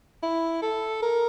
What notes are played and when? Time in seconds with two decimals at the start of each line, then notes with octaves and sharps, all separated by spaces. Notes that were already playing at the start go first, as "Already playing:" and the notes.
0.23 E4
0.62 A4
1.03 A#4